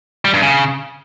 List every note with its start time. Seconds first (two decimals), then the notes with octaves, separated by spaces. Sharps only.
0.25 G3
0.34 G2
0.43 C#3